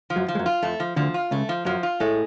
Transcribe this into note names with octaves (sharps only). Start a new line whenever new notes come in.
F3
F#2 F#3
F3
G#3
F#2 F#3
F4
F2 F3 A3
F3
D2 D3 F3
F4
C#2 C#3 A3
F3
F#2 F3 F#3
F4
A2 G#3 A3